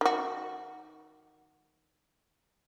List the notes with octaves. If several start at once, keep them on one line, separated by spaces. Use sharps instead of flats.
D#3 F#4